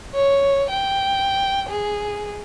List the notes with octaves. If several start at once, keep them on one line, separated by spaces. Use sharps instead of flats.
C#5
G5
G#4